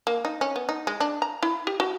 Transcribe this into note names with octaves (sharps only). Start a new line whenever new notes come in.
A#3
D#4
C#4
B3
D#4
G#3
D4
A#5
E4
G4
F#4